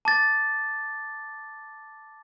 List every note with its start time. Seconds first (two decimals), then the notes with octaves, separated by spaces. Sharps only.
0.05 A5 D6 A6